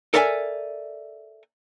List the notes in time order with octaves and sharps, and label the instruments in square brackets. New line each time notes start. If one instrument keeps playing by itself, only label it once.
[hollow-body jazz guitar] A4 A#4 D5 E5 F#5 G#5